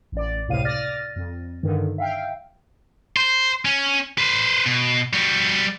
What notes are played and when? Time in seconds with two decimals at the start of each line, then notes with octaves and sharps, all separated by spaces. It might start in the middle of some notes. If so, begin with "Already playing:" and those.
0.12 A1 D5
0.48 C#2 A2 C3 F5 D#7
0.65 D5 F6 A6 A#6
1.16 F2
1.63 G2 D3 D#3
1.98 E5 F5 G5
3.17 C5
3.65 C#4
4.18 B4 C5
4.66 B2
5.13 G3 F#4